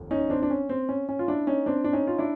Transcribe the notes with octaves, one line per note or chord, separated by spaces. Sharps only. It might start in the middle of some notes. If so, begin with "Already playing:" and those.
Already playing: F1 D#2
C#4 D#4
C4 D4
D4
C#4
C4
C#4
C#4
F4
D4 E4
C#4 D#4
C4 D4
D4
C#4 D#4
F4
D4 E4